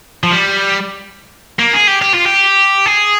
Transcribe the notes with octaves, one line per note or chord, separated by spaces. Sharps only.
F3
G3
A#3
G#4
G4
G4
F4
G4
G#4